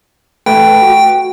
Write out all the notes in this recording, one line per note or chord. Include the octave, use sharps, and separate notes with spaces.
A3 B4 G5 A5
F#4